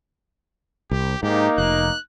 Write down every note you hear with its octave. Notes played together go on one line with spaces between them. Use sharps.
C2 G4
G#2 A#3 D#4 G4
F1 F#6